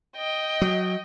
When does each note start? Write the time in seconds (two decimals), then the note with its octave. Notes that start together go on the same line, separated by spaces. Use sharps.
0.16 D#5 G5
0.62 F#3